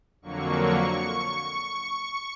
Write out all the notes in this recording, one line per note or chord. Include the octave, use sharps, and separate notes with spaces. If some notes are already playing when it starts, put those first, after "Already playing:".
F2 D3 F#3 A#3 C#6
C#6